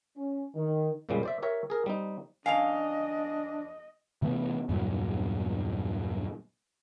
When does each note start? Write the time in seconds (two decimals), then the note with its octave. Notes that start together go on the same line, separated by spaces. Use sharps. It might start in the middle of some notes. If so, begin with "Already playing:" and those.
0.17 C#4
0.55 D#3
1.09 F2 A#2 C#3 F3 G3 G#3
1.23 C5 D5 E5
1.42 G4 A#4 C#5 E5
1.70 G#4 A#4
1.86 G3 C4 D#4
2.46 F2 C#4 D4 D#5 F5 G#5 A5 F7
4.22 C3 E3 A3 B3
4.69 E2 G2 A#2 F#3